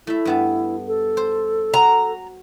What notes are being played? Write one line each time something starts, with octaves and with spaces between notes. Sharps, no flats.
A3 E4 E5
G2 B3 A5
A4
C5
F#4 A#5